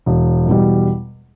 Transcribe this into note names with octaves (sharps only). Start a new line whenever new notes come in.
E1
E2 B2 G3